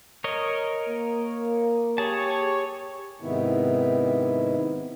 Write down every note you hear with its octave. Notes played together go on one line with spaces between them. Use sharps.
A#4 C#5 D#5
A#3
G4 G#4 C#5 A5
G#2 C3 D#3 B3 E4